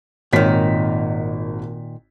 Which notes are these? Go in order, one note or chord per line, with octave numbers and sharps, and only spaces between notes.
G#1 A#2 D#3 C#5 B6